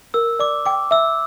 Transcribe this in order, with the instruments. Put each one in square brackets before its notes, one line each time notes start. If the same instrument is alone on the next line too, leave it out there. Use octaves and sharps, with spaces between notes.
[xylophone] A#4 [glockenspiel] E6
[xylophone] D5 [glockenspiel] D6
[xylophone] G5 [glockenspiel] D6
[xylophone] E5 [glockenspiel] E6